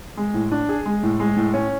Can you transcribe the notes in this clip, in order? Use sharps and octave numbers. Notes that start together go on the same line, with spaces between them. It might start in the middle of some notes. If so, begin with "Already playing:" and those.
G#3
A2
D4
G#4
G#3
A2
G#3
A2
C#4